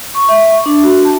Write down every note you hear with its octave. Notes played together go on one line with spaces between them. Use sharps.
C#6
E5
D4
F#4
A5